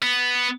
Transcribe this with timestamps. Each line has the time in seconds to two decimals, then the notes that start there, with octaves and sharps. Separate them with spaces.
0.03 B3